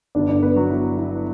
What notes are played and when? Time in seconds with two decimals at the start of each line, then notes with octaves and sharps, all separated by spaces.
0.15 G1 G2 D3 D4 D5
0.29 D4 D5
0.42 B3 B4
0.56 F#3 F#4
0.70 E4
0.98 E4